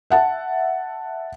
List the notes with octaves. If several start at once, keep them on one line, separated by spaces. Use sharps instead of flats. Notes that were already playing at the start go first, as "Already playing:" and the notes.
E5 F#5 A5